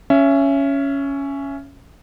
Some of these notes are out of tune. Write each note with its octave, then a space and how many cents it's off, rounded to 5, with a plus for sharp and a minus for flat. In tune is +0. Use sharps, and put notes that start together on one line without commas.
C#4 +5 E5 +25